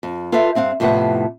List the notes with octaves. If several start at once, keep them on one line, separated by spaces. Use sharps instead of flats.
F2
F4 A4 B4 D5 E5 F5
G2 C4 F5 F#5
F2 A2 C3 B3 B4 F#5